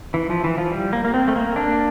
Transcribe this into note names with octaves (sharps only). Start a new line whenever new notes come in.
E3
F3
E3
F3
G3
A#3
A#3
C4
A3
A#3
A#3 D4